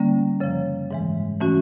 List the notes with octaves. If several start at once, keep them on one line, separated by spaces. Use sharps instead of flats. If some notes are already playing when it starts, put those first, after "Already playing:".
Already playing: D3 G3 A#3 C#4
F#2 C#3 F3
G#2 E3 G#3
E3 A3 C#4 F#4